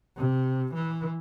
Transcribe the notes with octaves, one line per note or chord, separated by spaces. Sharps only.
C3
E3